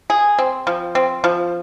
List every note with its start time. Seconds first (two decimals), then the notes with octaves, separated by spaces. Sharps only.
0.10 G#4
0.38 C4
0.67 F3
0.95 C4
1.24 F3